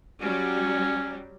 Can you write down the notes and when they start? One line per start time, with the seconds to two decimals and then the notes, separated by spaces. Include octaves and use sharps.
0.21 F#3 G3 C#4